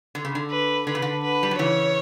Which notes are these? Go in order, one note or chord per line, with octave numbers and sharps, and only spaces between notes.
D3
C#3
D3
B4
D3 B4
C#3
D3
B4
G3
F#3
C#3 E3 C#5